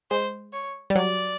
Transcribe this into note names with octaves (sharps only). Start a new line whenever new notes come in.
G#3 C5
C#5
G3
F#3 D5